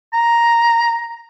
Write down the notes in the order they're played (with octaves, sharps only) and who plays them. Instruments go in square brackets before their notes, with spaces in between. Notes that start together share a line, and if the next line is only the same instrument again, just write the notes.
[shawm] A#5